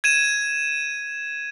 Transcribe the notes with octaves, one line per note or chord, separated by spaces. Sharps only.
G#6 D#7 E7